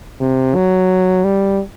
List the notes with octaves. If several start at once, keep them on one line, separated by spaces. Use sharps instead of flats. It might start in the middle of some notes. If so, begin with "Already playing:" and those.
C3
F#3
G3